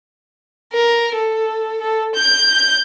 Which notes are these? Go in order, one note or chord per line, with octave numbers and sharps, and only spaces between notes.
A#4
A4
A4
G6